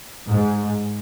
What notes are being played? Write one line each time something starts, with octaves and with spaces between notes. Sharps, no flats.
G#2